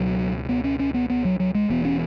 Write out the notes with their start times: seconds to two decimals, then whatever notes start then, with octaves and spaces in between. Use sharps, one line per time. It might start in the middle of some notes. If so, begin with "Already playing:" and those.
Already playing: C#2 B2 F#3
0.49 B3
0.64 C#4
0.79 C#4
0.94 B3
1.10 B3
1.25 F#3
1.40 F#3
1.55 G#3
1.70 E1 E2 B2 B3
1.85 C#4